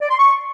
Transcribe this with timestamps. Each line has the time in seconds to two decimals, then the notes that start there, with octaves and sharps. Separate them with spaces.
0.01 D5
0.10 C6
0.19 C#6